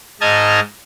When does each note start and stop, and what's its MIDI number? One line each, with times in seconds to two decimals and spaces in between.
0.21 0.60 44
0.21 0.60 75
0.21 0.60 81
0.21 0.60 82
0.21 0.60 89
0.21 0.60 92